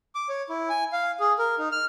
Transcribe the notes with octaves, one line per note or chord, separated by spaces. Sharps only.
D6
C#5
E4
G#5
F5
G#4
A#4
D#4
F6